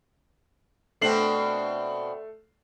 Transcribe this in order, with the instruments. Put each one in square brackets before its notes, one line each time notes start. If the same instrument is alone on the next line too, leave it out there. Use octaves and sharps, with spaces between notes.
[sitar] B2 C4 D4 [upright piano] A3 C7 F#7